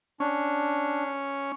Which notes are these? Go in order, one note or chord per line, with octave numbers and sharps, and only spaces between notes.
C#4 D4